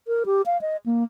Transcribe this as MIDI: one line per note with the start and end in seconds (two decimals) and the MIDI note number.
0.07 0.23 70
0.26 0.42 67
0.46 0.60 77
0.61 0.77 75
0.86 1.04 58